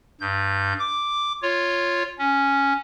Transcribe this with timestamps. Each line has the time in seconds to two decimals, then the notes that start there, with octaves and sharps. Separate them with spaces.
0.20 G2 G6
0.79 D6
1.42 F4 C#5
2.18 C#4